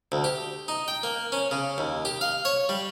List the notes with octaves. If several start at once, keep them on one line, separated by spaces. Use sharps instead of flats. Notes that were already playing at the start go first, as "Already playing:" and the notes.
D2
G4
D#4
G5
A#3
C#4
C#3
D#2
G4
F5
C#5
G3